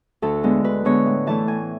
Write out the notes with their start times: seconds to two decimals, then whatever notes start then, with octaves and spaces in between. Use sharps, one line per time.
0.22 D2 A4
0.43 D3 G#3 B3
0.64 D2 B4
0.85 D3 G#3 B3 C#5
1.06 A2
1.27 E3 A3 A5
1.48 A2 G#5